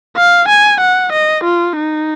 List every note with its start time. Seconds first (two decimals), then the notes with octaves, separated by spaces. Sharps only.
0.17 F5
0.49 G#5
0.81 F#5
1.13 D#5
1.44 F4
1.76 D#4